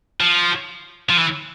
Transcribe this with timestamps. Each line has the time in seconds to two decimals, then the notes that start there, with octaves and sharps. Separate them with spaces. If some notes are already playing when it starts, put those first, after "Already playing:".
0.21 F3
1.09 F3
1.17 E3